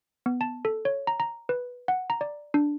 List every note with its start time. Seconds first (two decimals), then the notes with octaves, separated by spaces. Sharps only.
0.26 B3
0.41 A5
0.65 A4
0.85 C#5
1.07 A#5
1.20 A#5
1.49 B4
1.88 F#5
2.10 A#5
2.21 D5
2.54 D4